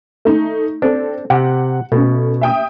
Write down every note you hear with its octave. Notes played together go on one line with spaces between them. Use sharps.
A3 D#4
C4 D4 A4
C3 G4 F#5
B2 A3 C#4
E5 G5 D#6